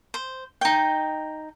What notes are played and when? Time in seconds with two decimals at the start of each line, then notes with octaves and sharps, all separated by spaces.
0.14 C5
0.61 D#4 G5